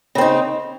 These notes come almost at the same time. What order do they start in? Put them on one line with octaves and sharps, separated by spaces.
C#3 C4 D#4